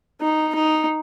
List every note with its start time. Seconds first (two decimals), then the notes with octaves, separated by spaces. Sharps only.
0.21 D#4
0.55 D#4